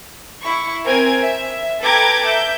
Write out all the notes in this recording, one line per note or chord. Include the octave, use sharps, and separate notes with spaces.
E4 C#6
C4 A#4 G#5 G#6
E5
A4 B4 G5 A#5 D6 G#6
E5 G6